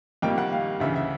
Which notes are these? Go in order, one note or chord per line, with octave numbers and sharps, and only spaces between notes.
F2 C3 D#3 G3 A#3 G5
F#5
F5
D2 C#3 E3 E5
E5